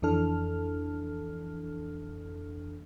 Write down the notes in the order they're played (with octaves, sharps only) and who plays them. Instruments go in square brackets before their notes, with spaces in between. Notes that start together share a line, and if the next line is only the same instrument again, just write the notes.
[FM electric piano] F2 E3 D4 A4 F6